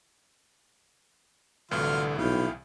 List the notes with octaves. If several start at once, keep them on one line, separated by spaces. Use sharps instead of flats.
C2 A2 D3 E3 F#3 F4 F6
B1 E4 F5 G5